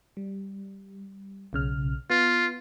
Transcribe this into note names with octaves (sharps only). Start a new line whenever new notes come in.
G3
B1 C#3 F6
B3 F4